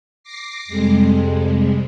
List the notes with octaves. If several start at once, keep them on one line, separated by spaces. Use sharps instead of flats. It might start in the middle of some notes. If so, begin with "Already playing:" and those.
D6 A#6 C7
F2 C3 G3 G#3